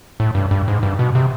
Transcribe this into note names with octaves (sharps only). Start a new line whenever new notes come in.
A2
G2
G2
G#2
G2
B2
C3